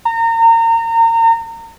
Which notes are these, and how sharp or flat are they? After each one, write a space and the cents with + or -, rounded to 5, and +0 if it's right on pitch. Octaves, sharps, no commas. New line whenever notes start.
A#5 -30